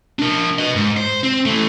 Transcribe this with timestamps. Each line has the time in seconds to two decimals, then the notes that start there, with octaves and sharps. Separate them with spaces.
0.19 D4 A#4
0.59 B4 D#5
0.76 G#2
0.97 C5
1.23 C4
1.46 E3 A3